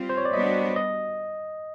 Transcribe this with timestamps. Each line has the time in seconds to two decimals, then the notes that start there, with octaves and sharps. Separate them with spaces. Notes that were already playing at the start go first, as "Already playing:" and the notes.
Already playing: G3 C4 F4
0.09 C5
0.18 C#5
0.25 D5
0.33 G3 B3 D4 F#4 B4 D#5
0.76 D#5